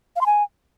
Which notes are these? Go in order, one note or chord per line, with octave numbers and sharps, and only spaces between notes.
F5
C6
G#5